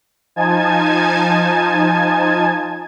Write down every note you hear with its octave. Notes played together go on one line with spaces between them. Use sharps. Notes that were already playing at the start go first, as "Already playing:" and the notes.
F3 D#4 G#5 A5 G#6